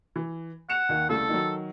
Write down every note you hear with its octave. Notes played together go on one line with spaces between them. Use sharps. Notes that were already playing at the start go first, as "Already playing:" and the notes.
E3
F#5 C#7 E7 F7
D#2 D#3
C2 C#3 A3 A4
D#3 F#3